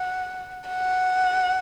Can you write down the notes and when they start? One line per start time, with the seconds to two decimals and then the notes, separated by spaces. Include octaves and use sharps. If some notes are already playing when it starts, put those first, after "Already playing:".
Already playing: F#5
0.68 F#5